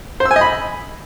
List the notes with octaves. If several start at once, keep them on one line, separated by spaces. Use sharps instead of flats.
C5
E6
G#5
D#5
B5